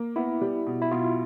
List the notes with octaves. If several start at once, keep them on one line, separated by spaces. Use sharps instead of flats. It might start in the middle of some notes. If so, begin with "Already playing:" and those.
Already playing: A#3
B3 E4
G3
B2
E4
B2 F4